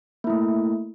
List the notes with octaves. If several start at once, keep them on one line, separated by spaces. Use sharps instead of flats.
A3 A#3 E4